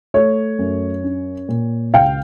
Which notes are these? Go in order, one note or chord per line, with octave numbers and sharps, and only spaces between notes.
A3 C#5
F#2
C#4
A#2
C#2 F5 G5